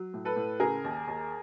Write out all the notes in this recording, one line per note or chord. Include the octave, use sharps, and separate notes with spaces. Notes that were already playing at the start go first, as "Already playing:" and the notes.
Already playing: F#3
A2
A4 B4
A2
C#3 G#4 A#4
D#2
D#2